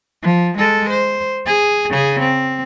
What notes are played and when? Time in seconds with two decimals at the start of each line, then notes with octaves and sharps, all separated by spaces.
0.23 F3
0.58 G#3 A4
0.90 C5
1.46 G#4
1.90 C#3 G#4
2.20 C4